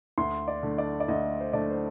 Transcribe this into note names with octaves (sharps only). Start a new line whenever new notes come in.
D2 C6
D5
D3 A3
D5
D5
D2 D#5
C5
D3 A3 D5
C5